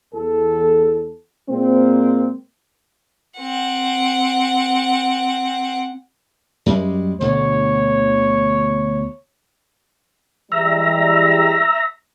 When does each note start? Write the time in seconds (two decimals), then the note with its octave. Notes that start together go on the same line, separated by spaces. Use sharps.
0.14 E2 A4
1.49 A#2 G#3 A#3 C4
3.39 C4 F#5
6.66 F#2 G3 G#3
7.20 D2 B2 D3 C#5
10.52 E3 G3 G#3 E5 A#5